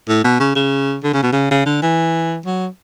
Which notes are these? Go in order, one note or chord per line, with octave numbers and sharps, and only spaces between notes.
A2
B2
C#3
C#3
D3
C#3
B2
C#3
C#3
D3
E3
F#3